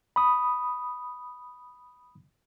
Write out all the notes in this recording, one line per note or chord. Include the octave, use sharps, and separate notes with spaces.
B5 D#6